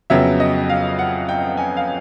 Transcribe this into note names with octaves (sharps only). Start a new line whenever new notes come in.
F2 C#3 F#3 B3 E5
D#5
F5
F#5
G5
G#5
F5